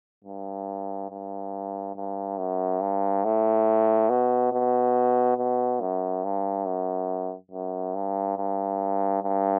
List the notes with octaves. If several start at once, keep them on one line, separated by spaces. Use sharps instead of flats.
G2
G2
G2
F#2
G2
A2
B2
B2
B2
F#2
G2
F#2
F#2
G2
G2
G2